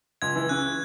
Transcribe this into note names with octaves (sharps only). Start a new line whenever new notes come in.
C#2 G#6
E3
C#3 F#6